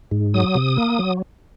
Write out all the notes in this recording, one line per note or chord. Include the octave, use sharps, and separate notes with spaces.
G#2
F#3 D#6
C3
A#3
F#3